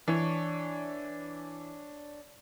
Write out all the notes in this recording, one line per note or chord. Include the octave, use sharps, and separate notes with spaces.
E3 D4 C#5